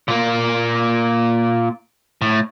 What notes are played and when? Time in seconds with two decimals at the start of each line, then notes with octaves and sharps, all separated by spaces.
0.08 A#2 A#3
2.22 A2